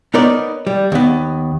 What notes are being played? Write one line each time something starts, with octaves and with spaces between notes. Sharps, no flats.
B3 D#4 A#4 C#5 D5
G3
D#2 B3